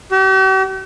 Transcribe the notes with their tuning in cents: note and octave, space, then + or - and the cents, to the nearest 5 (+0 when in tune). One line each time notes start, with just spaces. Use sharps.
G4 -45